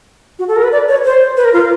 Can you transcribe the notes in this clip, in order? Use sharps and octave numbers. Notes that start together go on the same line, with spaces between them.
F#4
A4
A#4
B4
D5
C#5
C5
B4
A#4
F4